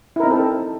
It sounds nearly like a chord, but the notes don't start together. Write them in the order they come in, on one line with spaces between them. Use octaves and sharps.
E4 A#4 D#4 C4 A4